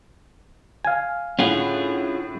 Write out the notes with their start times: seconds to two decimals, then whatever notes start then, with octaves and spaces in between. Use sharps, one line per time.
0.85 F5 G#5
1.39 A2 D3 C#4 F4 G#4 F#5